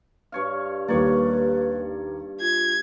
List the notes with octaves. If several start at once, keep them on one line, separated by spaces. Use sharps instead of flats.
G2 C#5 F5
D#2 G3 A#3 B4 C#5 D5
F4 G#6